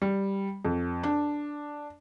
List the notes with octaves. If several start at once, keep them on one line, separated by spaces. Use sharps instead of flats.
G3
F2
D4